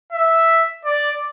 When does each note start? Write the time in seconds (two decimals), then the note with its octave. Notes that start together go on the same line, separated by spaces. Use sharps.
0.12 E5
0.85 D5